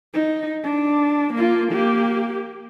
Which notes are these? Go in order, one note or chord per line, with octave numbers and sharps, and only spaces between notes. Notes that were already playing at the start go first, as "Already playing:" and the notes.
D#4
D4
A#3 F4
A#3 G4